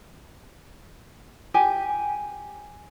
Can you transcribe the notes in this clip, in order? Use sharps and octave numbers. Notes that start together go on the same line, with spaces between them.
G4 G#5